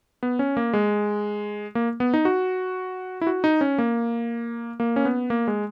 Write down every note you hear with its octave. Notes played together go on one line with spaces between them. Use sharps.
B3
C#4
A#3
G#3
A#3
B3
D#4
F#4
E4
F#4
D#4
C#4
A#3
A#3
C#4
B3
A#3
G#3